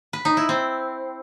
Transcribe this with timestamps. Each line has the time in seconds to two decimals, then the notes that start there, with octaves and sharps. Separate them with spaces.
0.13 B4
0.25 D#4
0.37 E4
0.49 C4